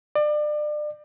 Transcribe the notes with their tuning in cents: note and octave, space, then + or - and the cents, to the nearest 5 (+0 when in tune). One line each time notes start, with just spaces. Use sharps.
D5 +30